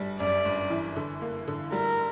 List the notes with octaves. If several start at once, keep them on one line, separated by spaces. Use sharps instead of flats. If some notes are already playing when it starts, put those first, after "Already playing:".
Already playing: G1 G3
F#2 D5
G1
E3
D3
A#3
D3
G3 A#4